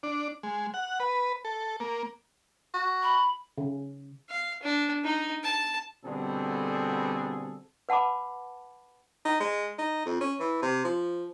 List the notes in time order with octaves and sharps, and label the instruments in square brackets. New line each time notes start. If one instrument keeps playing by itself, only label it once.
[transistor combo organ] D4
G#3
F#5
B4
A4
A#3
[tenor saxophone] F#4
[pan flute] B5
[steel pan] C#3
[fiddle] F5
D4
D#4
A5
[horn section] B2 D3 G3 C4 G#4 A4
[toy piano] B4 F#5 A5 B5 D6
[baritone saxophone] D#4
G#3
D#4
F2
C#4
E3
C3
F3